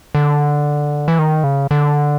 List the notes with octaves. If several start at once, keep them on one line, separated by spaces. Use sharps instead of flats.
D3
E3
D#3
C#3
D3